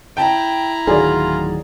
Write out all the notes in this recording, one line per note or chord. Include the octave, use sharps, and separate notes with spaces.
E4 G5 A5 A#5
D1 D#3 F#3 F4 G#4 D5